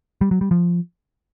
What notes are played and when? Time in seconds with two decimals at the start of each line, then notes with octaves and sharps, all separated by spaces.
0.21 G3
0.31 F#3
0.41 G3
0.51 F3